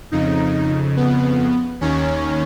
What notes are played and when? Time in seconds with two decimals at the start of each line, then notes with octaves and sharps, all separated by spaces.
0.12 F2 C#3 D#4
0.97 B3
1.81 D#2 D#3 C#4